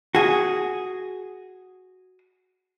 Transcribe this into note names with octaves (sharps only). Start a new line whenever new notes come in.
F#4 G#4